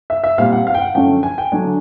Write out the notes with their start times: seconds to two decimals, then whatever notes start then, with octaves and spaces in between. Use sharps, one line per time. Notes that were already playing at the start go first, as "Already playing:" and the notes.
0.10 E5
0.24 E5
0.38 A#2 G3 C4 F5
0.52 F#5
0.67 F5
0.74 G5
0.81 F#5
0.95 F#2 D3 F3 A3 C#4 G5
1.23 G#5
1.38 G5
1.52 D3 F#3 A3 D4 G#5